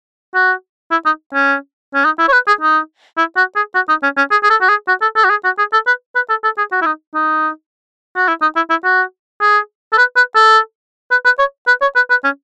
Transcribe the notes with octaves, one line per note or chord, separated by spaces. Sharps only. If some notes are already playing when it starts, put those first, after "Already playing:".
F#4
E4
D#4
C#4
C#4
D#4
E4
C#5
B4
G#4
D#4
E4
F#4
G#4
F#4
D#4
C#4
C#4
G#4
G#4
A4
F#4
G#4
F#4
A4
A4
F#4
G#4
F#4
G#4
A4
B4
B4
A4
A4
G#4
F#4
E4
D#4
D#4
F#4
E4
D#4
E4
E4
F#4
G#4
A4
B4
B4
A4
B4
B4
C#5
B4
C#5
B4
B4
C#4